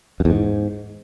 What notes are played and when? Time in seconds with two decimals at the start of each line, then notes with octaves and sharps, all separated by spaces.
0.20 F#2
0.25 E2
0.30 G#2